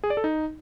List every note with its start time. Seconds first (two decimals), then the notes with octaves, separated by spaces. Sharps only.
0.04 G#4
0.10 D5
0.17 A4
0.24 D#4